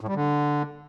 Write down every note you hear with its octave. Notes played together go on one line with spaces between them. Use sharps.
A2
G3
D3